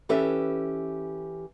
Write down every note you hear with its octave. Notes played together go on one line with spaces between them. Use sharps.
E3 C#4 G4 A4 B4 E5